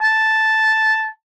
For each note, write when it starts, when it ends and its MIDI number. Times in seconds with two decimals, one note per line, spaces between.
0.01 1.06 81